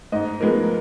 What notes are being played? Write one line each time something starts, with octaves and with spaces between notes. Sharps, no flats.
G#2 D#5
F3 G#3 B3 A#4